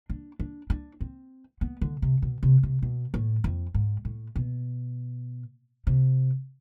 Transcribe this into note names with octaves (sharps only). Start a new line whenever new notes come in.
D4
D4
D4
C4
B3
D3
C3
B2
C3
C3
B2
A2
F2
G#2
A2
B2
C3